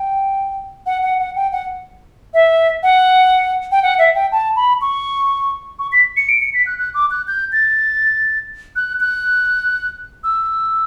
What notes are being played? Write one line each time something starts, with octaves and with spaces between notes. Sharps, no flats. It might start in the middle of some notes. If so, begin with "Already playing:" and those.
Already playing: G5
F#5
F#5
F#5
G5
F#5
E5
F#5
G5
F#5
E5
G5
A5
B5
C#6
C#6
B6
C#7
D7
C#7
B6
F#6
F#6
D6
F#6
G6
A6
F#6
F#6
E6